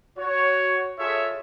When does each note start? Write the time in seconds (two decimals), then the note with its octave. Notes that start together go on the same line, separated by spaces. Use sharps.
0.17 F#4 C#5
0.99 F4 G#4 A4 C#5 E5